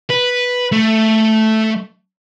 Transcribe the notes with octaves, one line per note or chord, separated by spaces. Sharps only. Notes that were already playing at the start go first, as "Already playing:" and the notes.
B4
A3